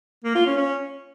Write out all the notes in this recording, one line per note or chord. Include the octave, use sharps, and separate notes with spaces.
A#3
F4
C#4
C#4